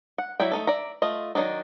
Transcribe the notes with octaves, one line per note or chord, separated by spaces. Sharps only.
F#5
F#3 E4 D5 E5 G5
A3 D#4 A4
D5 E5 A#5
A3 F4 D#5
D#3 F3 F#3 D4 D#4